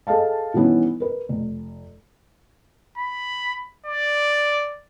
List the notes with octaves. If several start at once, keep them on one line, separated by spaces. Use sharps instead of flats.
G#4 A4 D#5 F5 A5
D#3 E3 G3 B3 C#4 E4
A#4 B4
F1
B5
D5